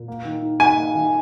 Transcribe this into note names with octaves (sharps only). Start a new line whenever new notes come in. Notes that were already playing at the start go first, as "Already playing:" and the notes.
Already playing: A#2
A#3
D#3
D#4
D#3 G#5
A#3
D#3